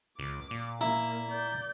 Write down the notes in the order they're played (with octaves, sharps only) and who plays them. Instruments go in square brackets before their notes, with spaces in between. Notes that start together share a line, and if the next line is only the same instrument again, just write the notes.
[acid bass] C#2 [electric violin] D6
[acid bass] A#2
[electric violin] A#3 [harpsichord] E4 E5 [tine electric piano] A#5
[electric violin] D5 G6